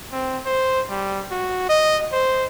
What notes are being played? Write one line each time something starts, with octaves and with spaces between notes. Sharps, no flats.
C4
C5
G3
F#4
D#5
C5